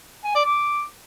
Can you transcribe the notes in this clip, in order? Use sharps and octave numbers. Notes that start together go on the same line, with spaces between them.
G#5
D5
D6